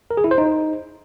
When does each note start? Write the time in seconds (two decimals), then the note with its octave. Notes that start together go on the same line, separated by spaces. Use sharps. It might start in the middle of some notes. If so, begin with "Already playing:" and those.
0.11 A#4
0.17 G#4
0.24 E4
0.31 C5
0.38 D#4